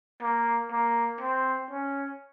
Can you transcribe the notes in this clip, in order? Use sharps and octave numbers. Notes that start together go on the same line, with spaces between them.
A#3
A#3
C4
C#4